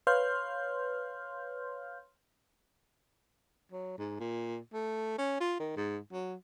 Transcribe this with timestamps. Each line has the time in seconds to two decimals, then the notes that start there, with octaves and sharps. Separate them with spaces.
0.07 B4 C#5 F5 C6 F6 G6
3.72 F#3
3.98 G#2
4.20 A#2
4.73 A3
5.18 C#4
5.40 F4
5.60 D#3
5.77 G#2
6.13 F#3